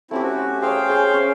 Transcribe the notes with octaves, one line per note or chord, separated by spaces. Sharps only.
A3 C4 C#4 E4 G4
F#4
G#4 C5 C#5 F5 G5
G#4
C#4